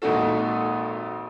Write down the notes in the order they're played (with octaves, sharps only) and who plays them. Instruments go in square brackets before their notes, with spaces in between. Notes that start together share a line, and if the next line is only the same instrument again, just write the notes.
[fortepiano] G#1 F2 A#2 D#4 F#4 A4